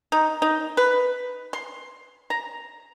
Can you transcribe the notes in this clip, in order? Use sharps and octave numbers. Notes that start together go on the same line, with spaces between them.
D#4
D#4
B4
C6
A#5